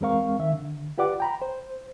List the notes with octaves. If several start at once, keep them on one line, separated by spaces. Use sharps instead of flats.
E2 G#3 C4 A#4 F5 C#6
D#3 E5
D3
F4 G4 B4 D5 F#5 D6
G5 A#5 B5
C5